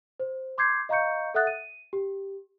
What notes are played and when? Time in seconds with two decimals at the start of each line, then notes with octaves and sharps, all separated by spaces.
0.20 C5
0.58 C6 D6 G6 G#6 C7
0.89 D#5 F5 A#5 C#6 G6 C#7
1.34 A4 E5 F#5 D#6 F#6 A6
1.47 D#7
1.93 G4